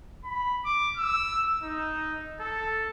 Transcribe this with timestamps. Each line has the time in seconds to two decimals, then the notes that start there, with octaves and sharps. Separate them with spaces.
0.24 B5
0.65 D6
0.97 E6
1.63 D#4
2.40 A4